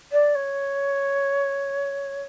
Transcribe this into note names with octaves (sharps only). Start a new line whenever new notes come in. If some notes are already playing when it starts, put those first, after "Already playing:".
D5
C#5